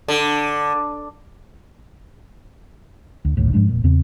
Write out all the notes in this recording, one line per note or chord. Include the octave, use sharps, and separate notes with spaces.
D3
D2
D1 A#1 D#2 A2
G#2 F3 G#3 D4
E1 A#2
E2 C#3 C4